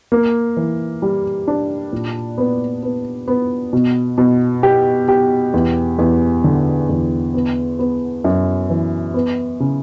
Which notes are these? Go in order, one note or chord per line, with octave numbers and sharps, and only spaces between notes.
A#3
E3
G3
D4
A#2
B3
B3
B3
B2
B2
G4
G4
E2
E2
D3
E2
B3
B3
F#2
E3
B3
C#3